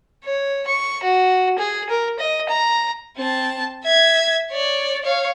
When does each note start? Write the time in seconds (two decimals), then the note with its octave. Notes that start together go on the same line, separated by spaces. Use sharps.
0.25 C#5
0.68 C#6
1.03 F#4
1.59 G#4
1.90 A#4
2.19 D#5
2.49 A#5
3.18 C4 A5
3.85 E5 G#6
4.50 C#5 D5
5.04 C#5 F5